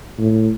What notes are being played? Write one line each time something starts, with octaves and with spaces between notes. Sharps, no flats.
A2